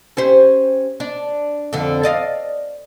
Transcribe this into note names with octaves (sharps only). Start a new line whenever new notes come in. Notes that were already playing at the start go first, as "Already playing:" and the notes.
C#4 G4 C5
D4
F2 D3
D5 D#5 F5